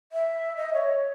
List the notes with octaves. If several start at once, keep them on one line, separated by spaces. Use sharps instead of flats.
E5
D#5
C#5